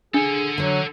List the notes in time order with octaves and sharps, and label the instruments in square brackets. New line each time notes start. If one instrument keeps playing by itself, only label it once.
[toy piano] D4 [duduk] G#4 [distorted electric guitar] A4 F#5
[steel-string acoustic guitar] D3 C#5 [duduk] F#3